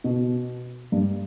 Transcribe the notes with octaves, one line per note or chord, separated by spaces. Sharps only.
B2
G2